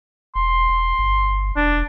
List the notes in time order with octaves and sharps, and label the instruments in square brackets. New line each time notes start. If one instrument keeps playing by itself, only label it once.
[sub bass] E1 [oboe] C6
[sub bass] E1
G1
[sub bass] E1 [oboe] D4